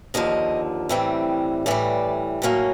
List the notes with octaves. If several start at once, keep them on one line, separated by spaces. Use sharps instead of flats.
D#2 D3 F3 D#5
A2 E3 G3 C4
A2 E3 G3 D5
A2 F#3 A#3 C#4